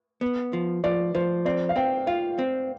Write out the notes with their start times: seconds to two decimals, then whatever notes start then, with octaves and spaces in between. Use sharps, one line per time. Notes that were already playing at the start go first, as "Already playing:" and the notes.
0.21 B3
0.53 F3
0.84 F3 D5
1.15 F3 C5
1.45 C4 D5
1.69 F5
1.76 C4 G5
2.07 F4 F5
2.39 C4